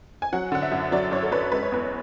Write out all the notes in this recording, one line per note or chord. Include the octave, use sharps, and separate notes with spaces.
G#5
F#3 F#5
D3 F#5
E5
F#2
F#3 D5
F#2 C#5
A4
F#2 B4
G#3 B4
C#5
E2 B4